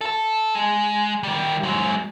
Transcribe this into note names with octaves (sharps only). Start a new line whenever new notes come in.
A4 A5
G#3
D#3 G3
F#3 G#3